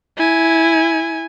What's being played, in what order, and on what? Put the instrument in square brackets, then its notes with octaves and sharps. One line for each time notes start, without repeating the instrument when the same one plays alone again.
[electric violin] E4 G#5